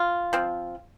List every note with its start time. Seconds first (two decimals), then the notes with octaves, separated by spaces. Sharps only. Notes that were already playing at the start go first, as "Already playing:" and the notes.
Already playing: F4
0.33 F3 C4